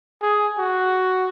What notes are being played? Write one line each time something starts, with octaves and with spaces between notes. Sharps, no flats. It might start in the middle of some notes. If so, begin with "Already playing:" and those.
G#4
F#4